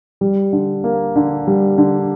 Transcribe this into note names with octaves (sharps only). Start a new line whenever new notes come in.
G3
D3
A#3
D3
G3
D3